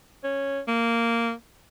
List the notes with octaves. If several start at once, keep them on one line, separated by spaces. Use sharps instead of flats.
C#4
A#3